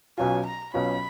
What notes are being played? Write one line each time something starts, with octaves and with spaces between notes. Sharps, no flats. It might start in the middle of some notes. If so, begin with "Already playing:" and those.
B1 B2 F#3 C#4 F4 G#5
A#5
B1 B2 F#3 C#4 F4 B5